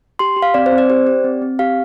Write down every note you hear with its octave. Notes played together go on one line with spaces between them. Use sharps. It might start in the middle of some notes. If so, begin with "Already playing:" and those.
G4 C6
G4
F5
C4 D5
C5
C4
D5
G4 C5
G4 D5
C4
C4
G4 F5